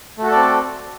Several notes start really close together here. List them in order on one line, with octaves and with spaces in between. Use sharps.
A3 F#4 A4 D5 C4